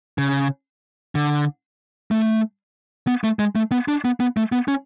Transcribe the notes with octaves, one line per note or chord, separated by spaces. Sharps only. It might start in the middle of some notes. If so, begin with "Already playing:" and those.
C#3
D3
A3
B3
A3
G#3
A3
B3
D4
B3
B3
A3
B3
C#4